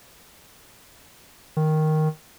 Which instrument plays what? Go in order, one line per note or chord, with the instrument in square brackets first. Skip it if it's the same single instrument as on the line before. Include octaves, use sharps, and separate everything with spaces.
[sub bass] D#3